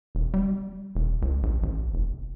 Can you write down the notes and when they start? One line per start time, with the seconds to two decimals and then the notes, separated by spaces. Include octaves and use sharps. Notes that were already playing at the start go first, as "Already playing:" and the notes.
0.15 E1
0.34 G3
0.95 E1
1.22 C#2
1.43 A#1
1.63 A1
1.94 F1